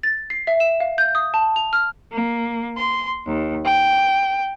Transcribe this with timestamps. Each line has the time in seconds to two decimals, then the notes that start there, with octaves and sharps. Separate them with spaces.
0.03 A6
0.30 C7
0.47 E5
0.60 E7
0.80 F5
0.98 G6
1.15 D#6
1.34 A5
1.56 F7
1.73 F6
2.11 A#3
2.78 C6
3.26 D#2
3.66 G5